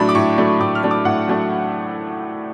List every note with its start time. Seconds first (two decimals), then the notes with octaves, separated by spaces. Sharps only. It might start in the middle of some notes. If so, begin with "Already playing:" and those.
Already playing: A2 F#3 A3 D4 B5
0.09 D6
0.15 A2 C#6
0.38 F#3 A3 D4
0.60 A2 D6
0.75 F6
0.83 F#3 A3 D4
0.91 D6
1.05 A2 F#5
1.28 F#3 A3 D4